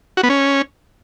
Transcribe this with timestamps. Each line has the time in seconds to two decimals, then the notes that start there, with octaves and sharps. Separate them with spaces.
0.17 F#4
0.23 B3
0.29 C#4